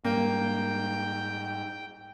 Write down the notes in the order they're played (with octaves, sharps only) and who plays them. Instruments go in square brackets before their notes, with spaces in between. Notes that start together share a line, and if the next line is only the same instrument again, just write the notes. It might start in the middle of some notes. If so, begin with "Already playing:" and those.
[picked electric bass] G#2 G3 [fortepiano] A#3 [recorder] G5